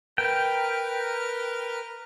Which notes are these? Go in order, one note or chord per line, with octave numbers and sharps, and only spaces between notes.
A#4 B4 G5 F6